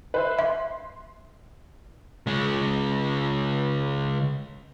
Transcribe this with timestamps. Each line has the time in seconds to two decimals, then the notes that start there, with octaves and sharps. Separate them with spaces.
0.14 B4 C5 E5
0.39 E5 C6
2.27 C#3 G#3